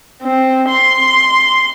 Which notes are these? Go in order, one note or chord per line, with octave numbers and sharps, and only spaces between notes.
C4
C6